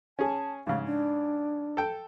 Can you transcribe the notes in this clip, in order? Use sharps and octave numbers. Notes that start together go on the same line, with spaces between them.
C#4 G#4 A5
G#2 C#3 F5
D4
A4 G5